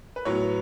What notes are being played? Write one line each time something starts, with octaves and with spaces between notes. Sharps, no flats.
B4
A2 F#3 B3 C#5